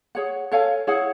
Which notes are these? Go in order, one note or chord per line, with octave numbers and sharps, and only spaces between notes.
G#4 C#5 F#5
A4 C#5 F5 G#5
E4 G#4 C#5 F#5